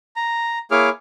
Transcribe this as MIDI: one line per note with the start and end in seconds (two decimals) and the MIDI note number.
0.16 0.59 82
0.71 0.89 58
0.71 0.89 64
0.71 0.89 68
0.71 0.89 73
0.71 0.89 86
0.71 0.89 89